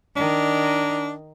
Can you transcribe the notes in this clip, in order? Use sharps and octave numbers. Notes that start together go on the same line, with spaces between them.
D#3 D4 D#4